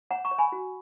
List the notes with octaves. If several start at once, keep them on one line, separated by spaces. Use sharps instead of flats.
C#5 F#5 A#5
A#5 C#6
C#5
G#5 B5
F#4